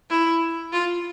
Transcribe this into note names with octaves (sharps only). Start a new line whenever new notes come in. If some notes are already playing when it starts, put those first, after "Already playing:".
E4
F4